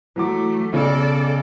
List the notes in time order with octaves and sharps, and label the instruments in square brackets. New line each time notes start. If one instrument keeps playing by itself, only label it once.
[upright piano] E3 F#3 D6 [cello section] A3
[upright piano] B1 C#3 [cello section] A4 D5